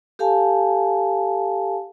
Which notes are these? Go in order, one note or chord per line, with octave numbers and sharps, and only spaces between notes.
G4 A4 F5 G#5 A5